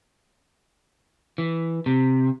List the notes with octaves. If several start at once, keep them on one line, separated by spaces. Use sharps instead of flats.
E3
C3